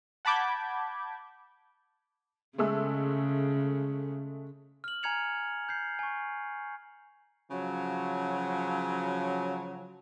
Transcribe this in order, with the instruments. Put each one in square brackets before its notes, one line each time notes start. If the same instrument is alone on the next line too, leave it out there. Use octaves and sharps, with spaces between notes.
[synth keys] F#5 A5 B5 D6 G6 G#6
[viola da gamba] C#3 [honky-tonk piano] G#3 A3 E6
[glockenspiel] F6 F#7
G#5 A#5 F6 G#6 C#7 F7
G6 C7
G#5 C#6
[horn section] C#3 F3 F#3